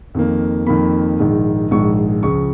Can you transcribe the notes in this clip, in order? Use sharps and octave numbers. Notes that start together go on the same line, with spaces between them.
F2 D#3 A#3
F2 D#3 A#3 B5
A#1 G#2 D#3 G#3
A#1 G#2 D#3 G#3 C#6
C#2 C#3 F3 C#6